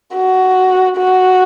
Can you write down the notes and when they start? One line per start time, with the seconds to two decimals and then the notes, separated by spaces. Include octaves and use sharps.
0.16 F#4
0.97 F#4